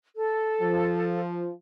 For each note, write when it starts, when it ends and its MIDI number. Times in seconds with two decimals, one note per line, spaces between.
0.16 1.19 69
0.61 1.51 53